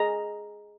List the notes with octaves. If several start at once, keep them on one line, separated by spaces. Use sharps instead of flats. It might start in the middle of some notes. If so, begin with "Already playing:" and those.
Already playing: G#4 D#5 A#5